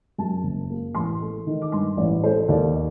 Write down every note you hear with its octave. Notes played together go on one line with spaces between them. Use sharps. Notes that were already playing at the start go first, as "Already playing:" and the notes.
F#2 A5
F#1
A#3
A1 C6
A3
D#3
D6
G2 C6
A1 D5
A3 C5
D#2 D5